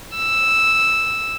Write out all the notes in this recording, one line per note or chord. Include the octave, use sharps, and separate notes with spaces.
E6